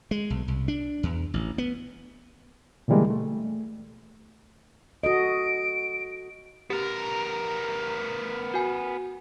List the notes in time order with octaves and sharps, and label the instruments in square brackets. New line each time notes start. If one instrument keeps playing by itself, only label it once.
[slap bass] G#3
B1
C2
D4
E2
A1
B3
[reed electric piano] B2 D3 E3 G3 G#3 A#3
A3
[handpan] F#4 A4 D#5 [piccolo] D7
[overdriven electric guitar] B3 A#4 [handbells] G4
[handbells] F#4 G#5